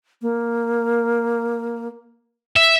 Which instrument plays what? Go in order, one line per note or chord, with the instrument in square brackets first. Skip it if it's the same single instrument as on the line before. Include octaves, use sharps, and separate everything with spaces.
[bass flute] A#3
[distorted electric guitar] E5